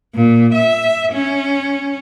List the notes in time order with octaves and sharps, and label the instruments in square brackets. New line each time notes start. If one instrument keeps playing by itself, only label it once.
[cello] A#2
E5
C#4